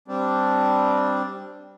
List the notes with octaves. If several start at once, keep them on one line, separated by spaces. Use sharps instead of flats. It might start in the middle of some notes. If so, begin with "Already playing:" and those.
G3 C4 D4